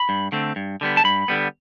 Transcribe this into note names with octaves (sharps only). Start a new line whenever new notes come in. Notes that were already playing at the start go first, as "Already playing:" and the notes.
Already playing: B5
G2
D3 A3 C4
G2
D3 G3 B3
A5
G2 B5
D3 G3 B3